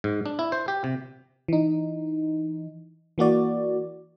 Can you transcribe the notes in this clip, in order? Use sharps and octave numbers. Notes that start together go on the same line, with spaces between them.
G#2
D4
E4
C5
G4
C3
E3 D#4
E3 A#3 F#4 D5